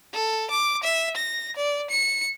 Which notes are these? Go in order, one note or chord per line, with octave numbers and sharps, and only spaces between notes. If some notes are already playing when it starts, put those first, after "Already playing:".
A4
D6
E5
A#6
D5
C#7